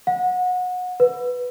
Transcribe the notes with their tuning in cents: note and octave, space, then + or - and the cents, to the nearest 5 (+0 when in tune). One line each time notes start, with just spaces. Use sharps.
F#5 -25
B4 +5